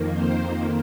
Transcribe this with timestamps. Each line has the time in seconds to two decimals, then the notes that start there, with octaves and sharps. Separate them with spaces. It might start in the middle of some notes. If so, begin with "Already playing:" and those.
Already playing: F2 D#3 A#3
0.10 C5